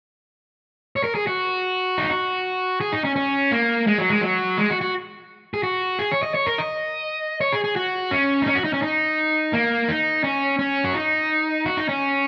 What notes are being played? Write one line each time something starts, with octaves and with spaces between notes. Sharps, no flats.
C#5
A#4
G#4
F#4
D#4
F#4
G#4
D#4
C#4
C#4
A#3
G#3
F#3
G#3
F#3
G#3
F#4
F#4
G#4
F#4
G#4
C#5
D#5
C#5
A#4
D#5
C#5
G#4
G#4
F#4
C#4
D#4
C#4
F#4
D#4
C#4
D#4
A#3
D#4
C#4
C#4
F#4
D#4
F#4
D#4
C#4